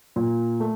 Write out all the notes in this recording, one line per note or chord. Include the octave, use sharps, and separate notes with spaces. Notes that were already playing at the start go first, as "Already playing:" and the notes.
A#2
A3